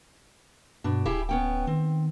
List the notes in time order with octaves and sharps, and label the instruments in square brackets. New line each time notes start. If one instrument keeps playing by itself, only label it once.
[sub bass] G2 [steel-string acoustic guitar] B2 D4
[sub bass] D1 [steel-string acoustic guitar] E4 G4 G#4
[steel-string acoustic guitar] B3 C#4 G5
[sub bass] D#3 [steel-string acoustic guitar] C4